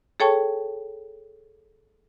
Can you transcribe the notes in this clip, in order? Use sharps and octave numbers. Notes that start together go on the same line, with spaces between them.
G#4 A4 C#5 G5 A5 C#6